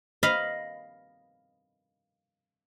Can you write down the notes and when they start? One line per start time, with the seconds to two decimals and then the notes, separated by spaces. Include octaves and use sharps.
0.23 D#5 F5 B5